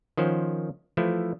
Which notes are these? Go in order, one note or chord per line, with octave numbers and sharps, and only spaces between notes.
D#3 F3 C#4 C5 F#5
E3 F3 A3 E4